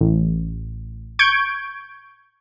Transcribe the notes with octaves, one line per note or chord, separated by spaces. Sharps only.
A1
C#6 G6 G#6 D7